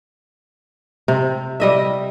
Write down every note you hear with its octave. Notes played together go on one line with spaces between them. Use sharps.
C3
G3 D#5 E5